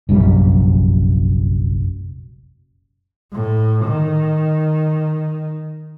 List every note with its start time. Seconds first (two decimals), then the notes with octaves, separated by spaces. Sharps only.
0.09 F1 A#1 F#2 G3
3.33 A2
3.85 D#3